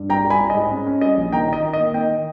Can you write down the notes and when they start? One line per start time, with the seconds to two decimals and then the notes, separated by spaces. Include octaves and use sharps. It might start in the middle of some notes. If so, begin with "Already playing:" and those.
Already playing: G2
0.09 G3 G5 A#5
0.25 G3
0.30 G#5 B5
0.41 G3
0.50 D#5
0.55 G#2
0.71 C#4
0.87 C#4
1.01 G3 D#5
1.17 A#1
1.32 D#3 G5 A#5
1.49 D#4 D#5
1.63 D#3
1.73 D#5
1.79 A#3
1.94 D#3 D#5 G5